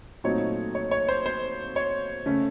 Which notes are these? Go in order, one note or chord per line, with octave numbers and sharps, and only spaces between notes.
A#2 F#3 A3 C4 D#4 C#5
C#5
C#5
C5
C5
C#5
C#3 A3 C#4